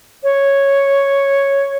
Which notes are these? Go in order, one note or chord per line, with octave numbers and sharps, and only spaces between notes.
C#5